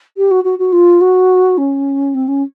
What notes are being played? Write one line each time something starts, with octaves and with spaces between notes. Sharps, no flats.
G4
F#4
F#4
F#4
F4
F#4
C#4
C4
C#4